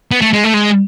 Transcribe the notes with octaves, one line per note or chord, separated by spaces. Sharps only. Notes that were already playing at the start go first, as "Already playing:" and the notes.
B3
A3
G#3
A3
G#3